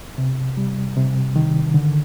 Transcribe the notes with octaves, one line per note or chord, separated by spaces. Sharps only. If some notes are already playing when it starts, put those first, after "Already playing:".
C3
G3
C3
D#3
D3